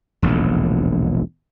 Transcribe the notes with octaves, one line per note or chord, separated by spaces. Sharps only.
E1 A#1 D#2 A2